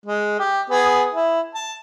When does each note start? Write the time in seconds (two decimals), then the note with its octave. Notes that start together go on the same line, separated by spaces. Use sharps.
0.06 G#3
0.40 G4
0.70 B3 G#4
1.13 E4
1.55 A5